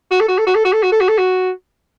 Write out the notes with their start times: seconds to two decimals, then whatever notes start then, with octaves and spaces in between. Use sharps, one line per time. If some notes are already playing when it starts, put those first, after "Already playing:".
0.11 F#4
0.20 A4
0.28 F#4
0.38 A4
0.46 F#4
0.55 A4
0.65 F#4
0.73 A4
0.83 F#4
0.92 A4
1.01 F#4
1.09 A4
1.18 F#4